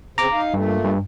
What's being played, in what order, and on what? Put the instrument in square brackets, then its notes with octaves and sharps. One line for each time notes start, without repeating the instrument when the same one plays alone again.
[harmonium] C#3 C4 [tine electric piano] A#5 D6
[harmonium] D#4 F5
[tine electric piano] G2 [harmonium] A#2 A3
[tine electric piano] G2